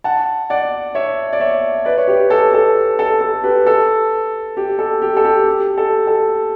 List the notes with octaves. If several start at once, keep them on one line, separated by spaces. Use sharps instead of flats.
F#5 A5
D5 F#5
C#5 E5
D5
C#5 E5
B4 D5
C#5
G4 B4
A4
A4
A4
A4
G4 B4
A4
G4
A4
G4
A4
G4
G4
A4
A4